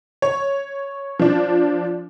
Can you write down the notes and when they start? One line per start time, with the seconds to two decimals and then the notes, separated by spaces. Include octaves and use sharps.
0.22 C#5
1.19 F3 D4